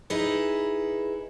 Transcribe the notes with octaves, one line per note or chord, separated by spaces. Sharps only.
D#4 E4 G#4 B4